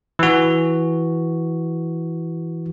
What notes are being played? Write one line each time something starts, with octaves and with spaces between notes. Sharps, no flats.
E3 F#4